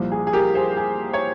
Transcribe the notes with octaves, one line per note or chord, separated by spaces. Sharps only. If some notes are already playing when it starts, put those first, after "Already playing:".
Already playing: C2 A#2 F3
G#4
G#4
G4 A#4
G#4 C5
G#4
C#5